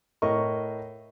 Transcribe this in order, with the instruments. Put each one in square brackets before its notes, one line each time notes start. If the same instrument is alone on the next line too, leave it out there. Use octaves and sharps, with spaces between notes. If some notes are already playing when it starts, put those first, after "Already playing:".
[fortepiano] A2 A#4 D#5 C#6